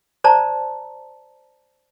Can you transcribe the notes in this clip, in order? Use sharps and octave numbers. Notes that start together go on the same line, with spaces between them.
C5 D5 A5 A#5